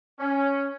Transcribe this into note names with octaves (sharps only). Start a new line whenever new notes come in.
C#4